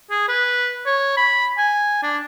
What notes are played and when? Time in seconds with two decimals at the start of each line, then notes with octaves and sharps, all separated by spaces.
0.11 G#4
0.28 B4
0.86 C#5
1.17 B5
1.58 G#5
2.03 D4